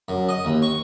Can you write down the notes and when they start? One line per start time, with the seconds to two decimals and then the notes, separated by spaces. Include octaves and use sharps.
0.08 F#2
0.29 D#5
0.45 D#2
0.62 C#6